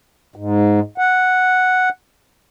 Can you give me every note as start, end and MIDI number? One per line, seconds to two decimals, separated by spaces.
0.36 0.80 44
0.98 1.89 78